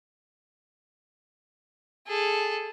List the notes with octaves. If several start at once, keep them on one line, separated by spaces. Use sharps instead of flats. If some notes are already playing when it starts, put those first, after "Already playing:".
G#4 A4